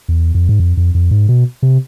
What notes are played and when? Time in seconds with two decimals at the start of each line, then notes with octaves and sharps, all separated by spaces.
0.08 E2
0.35 F2
0.49 G#2
0.60 F2
0.77 F2
0.95 F2
1.11 G#2
1.28 B2
1.62 C3